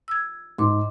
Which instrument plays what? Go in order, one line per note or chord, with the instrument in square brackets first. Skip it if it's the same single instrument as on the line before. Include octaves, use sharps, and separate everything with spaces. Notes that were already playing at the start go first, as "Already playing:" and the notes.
[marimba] E6 G#6
[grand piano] G#2 [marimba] C6 D6